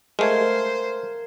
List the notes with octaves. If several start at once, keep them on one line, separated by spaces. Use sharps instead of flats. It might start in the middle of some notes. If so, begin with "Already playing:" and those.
G#3 A3 A#4 C5 F5 G#6